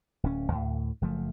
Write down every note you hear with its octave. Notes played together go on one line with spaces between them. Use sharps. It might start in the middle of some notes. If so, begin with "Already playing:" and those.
D1 C#4
D2 A2
F#1 F3 A3